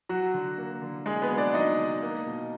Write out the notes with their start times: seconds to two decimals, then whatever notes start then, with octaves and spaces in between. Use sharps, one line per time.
0.09 F#3 F#4
0.34 D3
0.58 A#3
0.82 D3
1.06 G#3 A#3 G#4
1.22 B3 B4
1.29 F#3
1.38 D4 D5
1.54 F#3 D#4 D#5
1.78 D3
2.02 A#3
2.26 B2